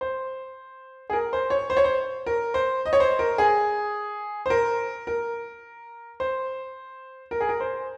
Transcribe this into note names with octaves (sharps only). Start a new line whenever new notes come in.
C5
G#4
A#4
C5
C#5
C5
C#5
C5
A#4
C5
D#5
C#5
C5
A#4
G#4
C5
A#4
A#4
C5
A#4
G#4
A#4
C5